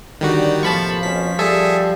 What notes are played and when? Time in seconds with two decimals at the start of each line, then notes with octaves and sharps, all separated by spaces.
0.21 D3 D#3 F#3 G3 F#4
0.63 A2 C3 F3 A#3 A5 B5 C#6
1.03 F2 B2 C#4 B6
1.39 G3 G#4 A4 E5